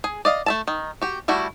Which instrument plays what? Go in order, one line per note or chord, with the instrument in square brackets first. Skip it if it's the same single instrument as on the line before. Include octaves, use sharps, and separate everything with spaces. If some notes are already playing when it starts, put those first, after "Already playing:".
[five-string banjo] G#4
D5 D#5 F5
A3 E5 A5
D#3
F#4 G4
G3 A3 E4 F#4